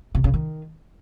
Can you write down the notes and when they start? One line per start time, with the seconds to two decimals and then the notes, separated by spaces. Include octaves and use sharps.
0.15 C3
0.24 C#3
0.34 D#3